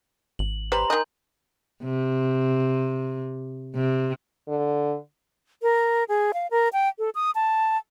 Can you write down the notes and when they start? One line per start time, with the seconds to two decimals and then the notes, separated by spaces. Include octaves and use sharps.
0.39 G#1 F#7
0.72 G3 B4 C5 A#5 C6 F#7
0.90 D#3 D#5 G#5 G6
1.84 C3
3.75 C3
4.48 D3
5.62 A#4
6.09 G#4
6.34 F5
6.51 A#4
6.73 G5
6.99 A4
7.15 D#6
7.35 A5